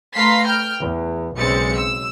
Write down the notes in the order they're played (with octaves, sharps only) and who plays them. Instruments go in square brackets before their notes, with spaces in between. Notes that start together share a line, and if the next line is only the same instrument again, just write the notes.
[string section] A3 B4 F5 A#5 C6 B6
G5 F6 G6
E2
B1 C#3 G#3 C4 A6 C#7
E6